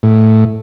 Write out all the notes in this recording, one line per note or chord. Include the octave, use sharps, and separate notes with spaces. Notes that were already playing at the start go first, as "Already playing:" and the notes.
A2